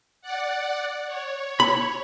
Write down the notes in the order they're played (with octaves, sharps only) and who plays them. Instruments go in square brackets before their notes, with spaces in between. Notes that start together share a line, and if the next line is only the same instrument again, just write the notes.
[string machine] D5 F#5
C#5
[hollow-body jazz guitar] B5